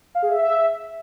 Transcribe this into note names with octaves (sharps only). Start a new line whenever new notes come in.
F5
G#4
E5